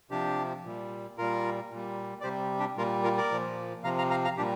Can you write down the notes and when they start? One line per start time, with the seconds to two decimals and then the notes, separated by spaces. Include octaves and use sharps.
0.11 C3 F3 D4 G4
0.64 A#2 G3
1.18 A#2 G3 F4 A#4
1.70 A#2
1.75 G3
2.21 D5
2.24 C3 G3 G4 C5
2.59 D4 G4
2.77 A#2 G3 F4 A#4
3.04 F4 A#4
3.17 A#4 D5
3.31 A#2 F3
3.84 C3 F3 F5 A#5
3.98 F5 A#5
4.11 F5 A#5
4.24 F5 A#5
4.37 A#2 G3 D4 G4